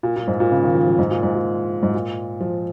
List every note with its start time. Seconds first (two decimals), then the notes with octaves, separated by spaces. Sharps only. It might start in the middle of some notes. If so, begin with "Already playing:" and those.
0.03 A#2
0.16 A#2
0.28 G#2
0.40 A#2
0.51 C#3
0.64 D#3
0.74 F3
0.88 F3
0.99 G#2
1.11 A#2
1.23 G#2
1.34 A#2
1.83 G#2
1.93 A#2
2.41 F3